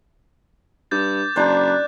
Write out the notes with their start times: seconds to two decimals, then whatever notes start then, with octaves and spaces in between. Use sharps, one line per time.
0.91 G2 D6 G6 A6
1.36 F#1 D4 C5 F#6